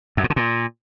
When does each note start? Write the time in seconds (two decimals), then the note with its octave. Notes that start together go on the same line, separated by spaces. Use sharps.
0.17 F#2
0.24 A2
0.30 D3
0.36 A#2